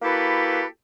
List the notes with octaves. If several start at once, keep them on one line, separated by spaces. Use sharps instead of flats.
A#3 E4 F#4 G4 A4 B4